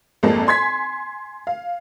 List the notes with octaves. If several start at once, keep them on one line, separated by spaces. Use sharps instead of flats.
G#1 F2 G#3 A#3 A4 A5
G#5 C6 G#6 B6
F5